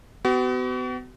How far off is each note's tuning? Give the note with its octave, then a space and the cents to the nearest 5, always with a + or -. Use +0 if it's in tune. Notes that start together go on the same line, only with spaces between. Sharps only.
B3 +35 F#4 +40